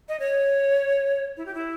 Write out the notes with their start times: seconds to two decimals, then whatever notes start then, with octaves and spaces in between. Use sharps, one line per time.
0.09 D#5
0.20 C#5
1.37 E4
1.46 G4
1.54 E4